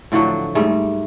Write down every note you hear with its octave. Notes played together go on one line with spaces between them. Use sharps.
A2 D3 F3 F#3
G#2 G3 A3